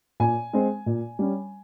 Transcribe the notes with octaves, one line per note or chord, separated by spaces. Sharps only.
A#2 G#5
G#3 C4
A#2
G3 C#4